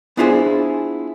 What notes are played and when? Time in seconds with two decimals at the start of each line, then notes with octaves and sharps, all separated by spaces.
0.17 B3 D4 E4 F4 G#4 C5